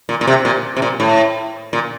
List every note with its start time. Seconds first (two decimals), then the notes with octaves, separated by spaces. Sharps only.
0.09 A#2
0.21 A#2
0.27 C3
0.45 A#2
0.76 C3
0.82 A#2
1.00 A2
1.73 A#2